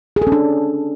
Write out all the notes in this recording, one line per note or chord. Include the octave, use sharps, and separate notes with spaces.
G#4
A4
C#4
D4